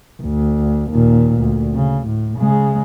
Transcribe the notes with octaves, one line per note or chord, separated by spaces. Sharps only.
D2
D#2 A#2
D2
C#3
A2
C#3 G#3